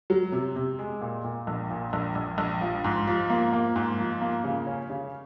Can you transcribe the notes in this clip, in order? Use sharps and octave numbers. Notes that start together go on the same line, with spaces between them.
F#3
C3
C3
G#3
A#2
A#2
A#1
A#2
A#1
A#1
A#1
F3
G#2
F3
A#3
A#3
G#2
F3
A#3
C#3
C#4
C#3